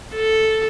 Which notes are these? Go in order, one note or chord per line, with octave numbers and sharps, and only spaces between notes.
A4